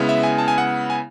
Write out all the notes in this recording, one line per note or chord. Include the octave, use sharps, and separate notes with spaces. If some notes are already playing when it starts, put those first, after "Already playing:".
Already playing: C#3 G#3 B3 E4
E5
G#5
A5
G#5
F#5
G#5